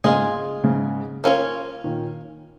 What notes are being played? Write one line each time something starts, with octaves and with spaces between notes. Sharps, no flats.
G#2 C#3 G#3 F4 G#4 D#5
G#2 C#3
A#3 C#4 F4 C#5
A#2 D#3